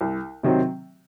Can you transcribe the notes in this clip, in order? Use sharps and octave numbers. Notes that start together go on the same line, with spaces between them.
C2
C3 D#3 F#3 C4